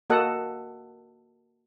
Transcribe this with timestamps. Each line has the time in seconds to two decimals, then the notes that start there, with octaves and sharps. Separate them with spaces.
0.10 A#3 F#4 A4 D#5 F#5